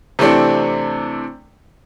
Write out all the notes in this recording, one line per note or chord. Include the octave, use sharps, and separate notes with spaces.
C3 E3 A3 C4 D4